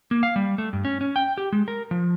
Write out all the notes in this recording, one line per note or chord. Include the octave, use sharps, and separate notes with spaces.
A#3
F5
G3
A3
G2
C#4
C#4
G5
G4
G#3
A#4
F3